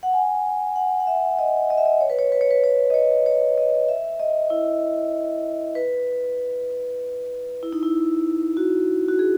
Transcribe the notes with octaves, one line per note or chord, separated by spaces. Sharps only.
F#5
G#5
F#5
F#5
E5
D#5
D#5
E5
D#5
C#5
B4
C#5
B4
C#5
B4
C#5
D#5
C#5
C#5
D#5
E5
D#5
E4
B4
E4
D#4
E4
F#4
F#4
G#4